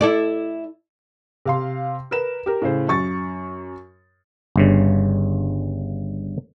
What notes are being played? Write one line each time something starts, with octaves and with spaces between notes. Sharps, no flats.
E4 A4 D5
C3 F5 C6
A#4 B4 E7
G4 A#4
A2 C#3 C5
F#2 C#6 A6
G1 G2 C#3